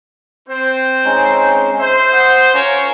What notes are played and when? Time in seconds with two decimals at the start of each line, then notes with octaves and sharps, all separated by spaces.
0.49 C4 C5
1.05 G#3 C#4 D#4
1.79 C5 E5
2.12 F#5 D#6
2.54 C#4 F4 A#4 C#5